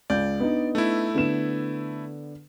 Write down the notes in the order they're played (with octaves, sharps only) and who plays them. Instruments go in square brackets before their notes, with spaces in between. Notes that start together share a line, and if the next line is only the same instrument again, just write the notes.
[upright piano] C#2 G6 [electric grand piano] D5
[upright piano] B3 D4 D#4
[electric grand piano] A3 E4
[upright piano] D3 B3 E7